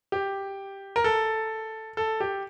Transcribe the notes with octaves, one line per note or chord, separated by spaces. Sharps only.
G4
A#4
A4
A4
G4